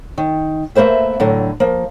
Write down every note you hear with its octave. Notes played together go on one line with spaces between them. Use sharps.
D#3
A3 A#3 B4 C5 E5
A2 D3 F#3
F3 A#3